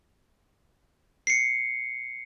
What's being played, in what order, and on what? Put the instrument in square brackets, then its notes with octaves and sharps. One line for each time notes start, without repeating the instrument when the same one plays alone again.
[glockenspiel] C7 C#7